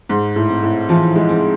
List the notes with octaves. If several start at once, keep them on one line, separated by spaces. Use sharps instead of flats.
G#2 G#3
A2
C4
A2
E3 F3
G#3
C4